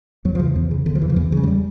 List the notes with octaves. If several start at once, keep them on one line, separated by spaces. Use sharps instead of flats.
E2 F#3
F3
C#3
E3
E2
C#3
E2 D3
F3
C#3 E3
F3
E2 E3
C#3
G3
F#3
G3